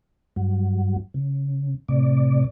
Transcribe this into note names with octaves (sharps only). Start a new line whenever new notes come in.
G2 F#3
C#3
A2 C3 D5